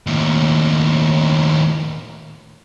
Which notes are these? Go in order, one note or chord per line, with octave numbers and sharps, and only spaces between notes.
D#2 A2